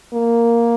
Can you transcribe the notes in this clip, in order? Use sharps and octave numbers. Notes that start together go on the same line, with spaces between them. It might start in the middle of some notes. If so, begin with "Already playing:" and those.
A#3